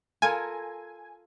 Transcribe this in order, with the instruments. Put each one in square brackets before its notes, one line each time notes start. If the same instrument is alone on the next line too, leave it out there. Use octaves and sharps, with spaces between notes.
[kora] F4 A4 A#4 [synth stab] G#5